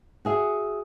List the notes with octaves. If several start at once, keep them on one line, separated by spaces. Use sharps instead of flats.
F#4 G#4 E5